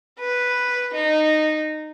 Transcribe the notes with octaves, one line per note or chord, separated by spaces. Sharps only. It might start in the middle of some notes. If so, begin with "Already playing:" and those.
B4
D#4